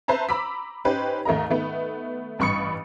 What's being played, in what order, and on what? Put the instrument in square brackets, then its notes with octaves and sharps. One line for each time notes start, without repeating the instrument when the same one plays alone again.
[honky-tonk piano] B4 C5 E5 A5 A#5
A#5 B5 D6 E6 B6
C#4 D#4 G4 B4 C5
D#2 A3 A#4 D#5 A#5
D#3 A3 B3
A1 G2 B5 C#6 D#6 C#7